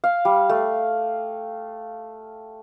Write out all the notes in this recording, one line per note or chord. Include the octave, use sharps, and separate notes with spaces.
F5
G3
A3